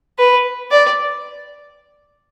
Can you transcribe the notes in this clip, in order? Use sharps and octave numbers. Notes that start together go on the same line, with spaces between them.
B4
D5